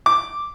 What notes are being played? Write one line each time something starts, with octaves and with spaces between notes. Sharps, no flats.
D6